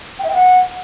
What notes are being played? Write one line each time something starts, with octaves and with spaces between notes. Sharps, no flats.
G5
E5
G5
F#5